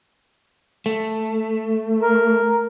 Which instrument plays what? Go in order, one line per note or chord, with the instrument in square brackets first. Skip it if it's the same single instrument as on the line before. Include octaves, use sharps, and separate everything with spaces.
[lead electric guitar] A3
[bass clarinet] A#4